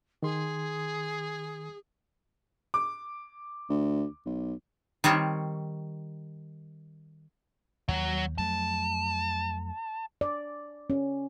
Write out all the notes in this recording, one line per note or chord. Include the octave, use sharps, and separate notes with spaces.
D#3 G#4 C6
D6
D2
B1
D#3 G3 C4 C#5
D#2 F#3
F2 F#3 A3 A5
D5
C#4